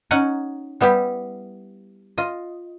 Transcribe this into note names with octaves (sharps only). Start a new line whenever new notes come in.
C#4 D#4 D#5 F#5 A#5
G3 B3 E4 G4
F4 D#5